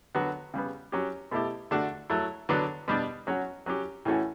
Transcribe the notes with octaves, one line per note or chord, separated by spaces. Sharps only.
D3 F#3 B3 F#4
C#3 G3 B3
F#3 C#4 G4
B2 A3 E4 G4
D3 A3 D4 F#4
F#3 A3 E4
D3 F#3 B3 D4
B2 G3 D4
F#3 C#4 F#4
F#3 C#4 G4
A2 E3 A3 C#4 F#4